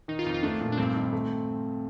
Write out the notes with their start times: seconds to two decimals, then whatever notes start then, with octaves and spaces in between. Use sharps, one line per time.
0.08 D#3 D#4
0.19 F4
0.26 F2 D#4
0.34 F4
0.43 A3 D4
0.61 A#2
0.72 D4
0.77 G2 C4
0.95 D#3
1.13 A3